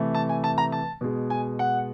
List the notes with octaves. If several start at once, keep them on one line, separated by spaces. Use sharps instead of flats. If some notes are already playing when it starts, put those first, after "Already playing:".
Already playing: C3 E3 A3
A5
G#5
A5
A#5
A5
B2 G#3
G#5
F#5